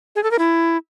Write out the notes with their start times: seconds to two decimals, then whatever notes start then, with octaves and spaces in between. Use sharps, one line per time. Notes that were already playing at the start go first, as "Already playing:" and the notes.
0.16 G#4
0.23 A4
0.31 A#4
0.39 E4